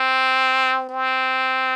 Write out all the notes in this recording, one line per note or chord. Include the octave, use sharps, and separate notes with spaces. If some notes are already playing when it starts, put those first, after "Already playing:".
Already playing: C4
C4